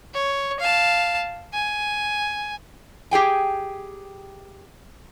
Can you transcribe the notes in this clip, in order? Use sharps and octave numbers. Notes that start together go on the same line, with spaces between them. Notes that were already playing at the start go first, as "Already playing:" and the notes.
C#5
F5 A5
G#5
G4 G#4 G5 G#5